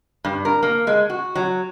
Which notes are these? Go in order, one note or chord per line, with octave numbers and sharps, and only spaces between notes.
G2
A#4
A#3
G#3
F#4
F#3